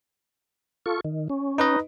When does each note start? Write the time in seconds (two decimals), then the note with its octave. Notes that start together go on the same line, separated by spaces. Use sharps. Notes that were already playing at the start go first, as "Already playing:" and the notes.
0.86 F4 A4 C#6
1.05 D#3
1.30 C#4
1.58 D#4 B4 D#5